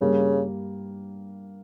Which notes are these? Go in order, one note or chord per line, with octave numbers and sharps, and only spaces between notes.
G2 C#3 G3 A#3